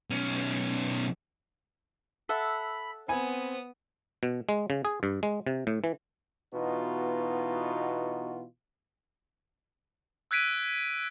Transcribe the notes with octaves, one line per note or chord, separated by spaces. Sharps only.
B1 C#4
A4 E5 F#5 B5
B3 C4 G#5 B5 D#6
B2
G#3
C#3
G#4
G2
G#3
C3
A2
E3
B2 E3 B3 D#4 F4 F#4
E6 F#6 G#6 B6 D7 D#7